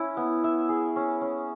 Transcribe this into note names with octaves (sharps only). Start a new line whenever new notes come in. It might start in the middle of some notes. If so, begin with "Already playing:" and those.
Already playing: C#4 E4
B3
E5
G#4
C#4
C#4